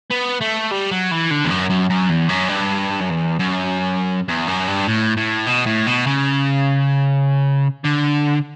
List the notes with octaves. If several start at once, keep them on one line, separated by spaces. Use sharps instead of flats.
B3
A3
G3
F#3
E3
D3
E2
F#2
F#2
F#2
E2
F#2
G2
F#2
E2
F#2
E2
F#2
G2
A2
A2
B2
A2
B2
C#3
D3